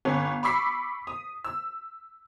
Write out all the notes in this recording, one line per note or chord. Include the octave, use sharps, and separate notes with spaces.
G1 C#4
B5 C#6 D6 E6 B6 C7
D#6
E6